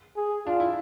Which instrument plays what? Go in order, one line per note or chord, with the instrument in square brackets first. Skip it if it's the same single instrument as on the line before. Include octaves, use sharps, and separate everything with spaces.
[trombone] G#4
[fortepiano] D4 [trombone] F4
[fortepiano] E4